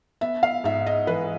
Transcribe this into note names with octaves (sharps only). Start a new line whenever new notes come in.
B3 E5
F5
G#2 E5
D#5
E3 B4